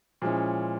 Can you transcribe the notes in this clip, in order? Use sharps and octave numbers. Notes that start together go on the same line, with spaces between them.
A#2 F3 G#3 C#4 E4